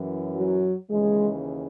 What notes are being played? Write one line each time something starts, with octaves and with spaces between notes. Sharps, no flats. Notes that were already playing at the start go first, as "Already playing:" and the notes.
Already playing: F#2 E3
F#3
D#2 C#3 E3 G#3